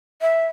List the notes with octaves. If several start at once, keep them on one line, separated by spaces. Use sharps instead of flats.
E5